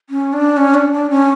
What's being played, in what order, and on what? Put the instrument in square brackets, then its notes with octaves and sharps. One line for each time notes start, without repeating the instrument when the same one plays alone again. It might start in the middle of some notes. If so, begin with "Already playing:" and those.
[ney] C#4
D4
C#4
D4
D4
C#4